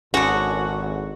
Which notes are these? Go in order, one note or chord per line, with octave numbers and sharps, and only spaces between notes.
G#1 D3 C#4 F#4 G#4